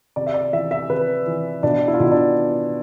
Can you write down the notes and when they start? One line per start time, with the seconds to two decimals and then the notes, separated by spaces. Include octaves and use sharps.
0.16 C3 D5
0.27 E5
0.34 D5
0.53 E3 E5
0.71 E5
0.89 C3 B4
1.26 E3
1.63 B2 D4
1.88 E4
1.94 F4
2.00 B2 E4
2.11 D4